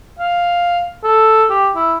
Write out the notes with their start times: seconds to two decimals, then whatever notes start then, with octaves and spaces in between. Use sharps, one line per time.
0.19 F5
1.04 A4
1.50 G4
1.76 E4